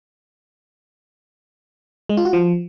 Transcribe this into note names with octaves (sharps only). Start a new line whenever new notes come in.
G#3
F4
F#4
F3